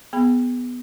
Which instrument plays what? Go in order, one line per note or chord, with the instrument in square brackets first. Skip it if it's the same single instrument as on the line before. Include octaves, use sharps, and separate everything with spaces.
[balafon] B3 G#4 B5